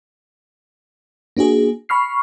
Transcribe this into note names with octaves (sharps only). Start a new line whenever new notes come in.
A#3 D4 F#4 G#4
B5 C#6 F6 C7